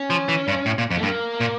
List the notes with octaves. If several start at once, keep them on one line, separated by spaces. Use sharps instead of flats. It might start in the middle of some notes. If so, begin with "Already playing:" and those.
Already playing: C#4
F3
E3
G2
A2
A#2
F2
A3
G2 A#3
A#2